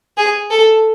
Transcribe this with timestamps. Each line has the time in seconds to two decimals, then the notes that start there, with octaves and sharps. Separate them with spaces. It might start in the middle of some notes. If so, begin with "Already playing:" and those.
0.17 G#4
0.51 A4